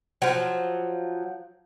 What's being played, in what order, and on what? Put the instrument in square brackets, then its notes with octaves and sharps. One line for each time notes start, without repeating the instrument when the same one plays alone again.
[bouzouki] F3 F#3